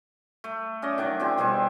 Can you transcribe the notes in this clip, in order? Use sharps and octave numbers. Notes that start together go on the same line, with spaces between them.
A3
C#4 D5 D#5
D#3 F#3 D4 D5
F3 C4 G#4
B2 G3 C4 G#4